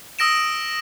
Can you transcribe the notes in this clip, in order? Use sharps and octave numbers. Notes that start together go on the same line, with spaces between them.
D#6 E6 A#6 D7 E7